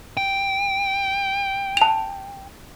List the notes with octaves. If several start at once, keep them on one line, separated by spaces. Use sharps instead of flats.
G5
A5 F7